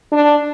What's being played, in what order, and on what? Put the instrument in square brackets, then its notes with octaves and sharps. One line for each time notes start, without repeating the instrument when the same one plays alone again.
[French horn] D4